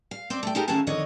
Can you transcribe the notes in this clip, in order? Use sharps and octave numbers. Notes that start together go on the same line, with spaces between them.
F5
C4 C5 D5
A3 G5
G#3 D#4 E4 G4 A4 A#4
A2 D#3 C#4 E4 F5 A5
F2 D3 D#3 C#5 D#5